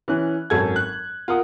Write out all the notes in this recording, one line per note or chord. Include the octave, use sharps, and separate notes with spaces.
E3 C#4 F#6
G#1 F#2 A4 G#6
F#6
F4 A#4 F#5 D#6